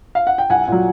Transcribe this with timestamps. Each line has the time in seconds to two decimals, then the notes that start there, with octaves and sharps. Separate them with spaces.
0.15 F5
0.27 F#5
0.38 G5
0.50 C2 F#5 G#5
0.67 A#2 F#3